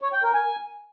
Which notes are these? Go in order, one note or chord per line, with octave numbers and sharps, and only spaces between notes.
C#5
G5
A#4
G#5